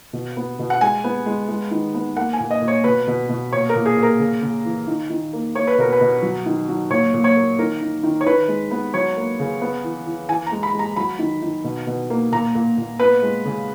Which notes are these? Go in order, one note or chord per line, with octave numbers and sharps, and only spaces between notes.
B2
B3
B2
F#5
G#3 G#5
B3
G#3
G#3
D#3
B3
A#3 F#5
G#5
A#2
D#5
A#2
C#5
B2 B4
B2
B2
A#2 C#5
A#4
A#2
G#4
A#2
A#4
C#3
C#3
E3
D#3
D#3
A#3
A#3 C#5
B4
B2 A#4
B4
B2
F#3
D#3
F#3
A#2 C#5
A#2
C#5
A#3
D#3 A#4
D#3
D#3
C#5
D#3 B4
G#3
B3
F#3 C#5
A#3
C#3
B3
E3
E3
E3 G#5
A#5
G#3
B5
G#3
A#5
F#3 B5
D#3
D#3
B2
B2
A#3
A#2 A#5
A#2
A#2
B3 B4
G#3
C#3